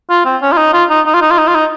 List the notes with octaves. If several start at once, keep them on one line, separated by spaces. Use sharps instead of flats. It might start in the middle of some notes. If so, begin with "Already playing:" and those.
F4
C4
C#4
F4
D#4
F4
D#4
D#4
F4
D#4
F4
D#4
F4
D#4